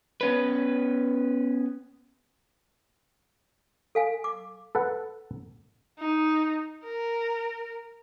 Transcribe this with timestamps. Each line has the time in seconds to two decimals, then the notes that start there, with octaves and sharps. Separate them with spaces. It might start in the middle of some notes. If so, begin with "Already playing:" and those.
0.21 B3 C#4 B4
3.95 A4 F5 G#5
4.24 D6
4.75 A4 B4 F#5
5.99 D#4
6.85 A#4